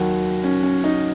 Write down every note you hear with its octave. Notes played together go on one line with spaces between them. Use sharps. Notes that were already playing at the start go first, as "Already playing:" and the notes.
Already playing: D#2 D#3 F#3 F#4
C#4
C#4
D#4